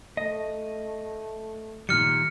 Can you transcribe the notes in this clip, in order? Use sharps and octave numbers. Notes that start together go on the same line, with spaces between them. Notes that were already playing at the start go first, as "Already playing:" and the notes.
A3 D#5
A#2 D#3 G3 F6 C#7